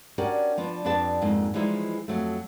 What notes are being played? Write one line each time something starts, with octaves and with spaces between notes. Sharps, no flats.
C#4 D4 F#4 G4 A#4 D5
F3 B3 D4
F2 D4 G4 B4 A5
F2 G#2 A#3
E3 F3 G3 G#3 D#4 E4
F2 F#3 A3